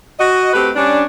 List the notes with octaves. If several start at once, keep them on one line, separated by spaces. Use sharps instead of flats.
F#4 D#5
A3 C4 G4 B4
G3 C#4 D4